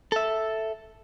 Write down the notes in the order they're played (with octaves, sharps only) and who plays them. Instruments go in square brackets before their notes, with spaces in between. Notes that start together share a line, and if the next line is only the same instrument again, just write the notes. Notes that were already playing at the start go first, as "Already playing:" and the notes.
[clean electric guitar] A4 E5